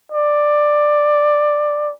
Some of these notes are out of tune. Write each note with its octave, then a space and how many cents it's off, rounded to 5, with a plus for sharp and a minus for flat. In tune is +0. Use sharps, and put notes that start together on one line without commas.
D5 +10